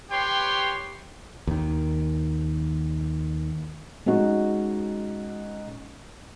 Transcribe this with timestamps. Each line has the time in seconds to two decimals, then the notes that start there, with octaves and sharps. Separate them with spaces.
0.11 G4 B4 C#5 G5 C6
1.47 D#2 D#3
4.06 G#3 C#4 D#4 F#4